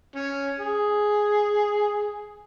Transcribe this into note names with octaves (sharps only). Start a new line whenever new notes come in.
C#4
G#4